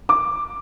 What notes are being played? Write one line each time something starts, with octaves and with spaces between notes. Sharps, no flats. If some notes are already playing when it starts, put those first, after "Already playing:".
D6